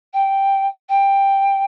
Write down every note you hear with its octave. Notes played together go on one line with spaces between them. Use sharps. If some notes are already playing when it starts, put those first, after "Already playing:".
G5
G5